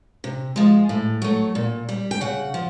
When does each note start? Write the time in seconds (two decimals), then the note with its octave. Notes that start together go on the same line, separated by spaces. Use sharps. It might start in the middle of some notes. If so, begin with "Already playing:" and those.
0.24 C3
0.56 F3 G#3
0.89 A2
1.22 F#3 A3
1.55 A#2
1.89 G3
2.11 G5
2.21 C#3 F#5
2.54 F3